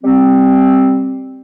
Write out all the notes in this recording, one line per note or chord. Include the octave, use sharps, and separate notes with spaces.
G3 C4